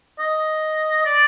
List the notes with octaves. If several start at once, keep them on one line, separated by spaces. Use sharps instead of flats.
D#5
D5